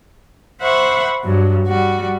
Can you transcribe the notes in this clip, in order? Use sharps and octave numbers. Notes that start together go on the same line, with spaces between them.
C5 E5 F#5 B5 C#6
G2 F#3
G3 F#4